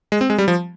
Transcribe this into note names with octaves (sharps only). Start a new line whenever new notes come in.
G#3
C4
G#3
G3
F3